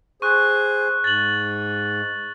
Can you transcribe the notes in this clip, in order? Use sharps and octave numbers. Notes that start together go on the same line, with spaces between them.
G#4 C5 C#6 F#6
G#2 A6 F#7